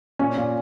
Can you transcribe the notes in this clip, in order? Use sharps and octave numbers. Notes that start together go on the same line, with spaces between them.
A#2 C#4
A#2